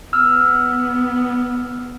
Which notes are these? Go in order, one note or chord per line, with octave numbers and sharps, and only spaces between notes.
B3 E6 F6